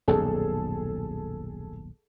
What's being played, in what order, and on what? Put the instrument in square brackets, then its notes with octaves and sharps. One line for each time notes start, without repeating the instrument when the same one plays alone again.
[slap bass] D#1 B1 F#2 [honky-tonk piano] G#4 A4